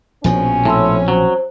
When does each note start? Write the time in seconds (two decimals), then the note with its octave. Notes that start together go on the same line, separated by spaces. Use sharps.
0.24 A#1 B2 F3 C4 C#4 G#5
0.65 A2 A5 C6 E6
1.08 F#3 C5